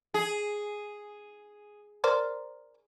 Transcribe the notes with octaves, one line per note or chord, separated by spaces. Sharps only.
G#4
A#4 C5 D5